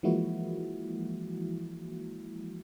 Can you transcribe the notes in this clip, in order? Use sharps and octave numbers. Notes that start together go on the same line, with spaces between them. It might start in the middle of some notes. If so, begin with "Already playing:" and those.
E3 F3 G#3 A#3 E4 F#4